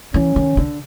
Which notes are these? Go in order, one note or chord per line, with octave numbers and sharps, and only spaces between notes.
E3 C#4
D#3
D3